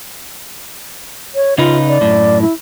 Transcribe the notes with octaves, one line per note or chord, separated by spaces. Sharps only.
C#5
C#3 D#4 F4 B4
D5
F#2 A2
E4